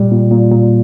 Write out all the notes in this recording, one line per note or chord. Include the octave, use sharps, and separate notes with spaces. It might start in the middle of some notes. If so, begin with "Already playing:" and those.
Already playing: A#2 G3
A#2
A#2
A#2